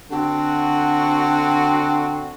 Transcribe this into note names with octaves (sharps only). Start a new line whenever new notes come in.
D3 C4 F#4